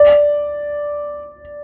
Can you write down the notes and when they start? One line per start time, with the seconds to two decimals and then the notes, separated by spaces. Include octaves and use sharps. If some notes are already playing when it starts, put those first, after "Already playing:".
Already playing: D5